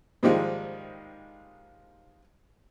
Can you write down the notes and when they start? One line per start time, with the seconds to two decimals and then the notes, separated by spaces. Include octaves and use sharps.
0.23 G#2 D#3 F3 G3 G#3 A#3